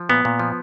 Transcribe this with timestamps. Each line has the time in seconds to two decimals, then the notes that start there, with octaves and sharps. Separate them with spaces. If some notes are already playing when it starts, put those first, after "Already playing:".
Already playing: F3
0.09 A#2 B3
0.25 A#2
0.39 F3